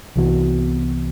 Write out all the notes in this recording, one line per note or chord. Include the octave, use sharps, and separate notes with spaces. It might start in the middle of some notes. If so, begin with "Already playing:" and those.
C2 C3 E3 B3 F#4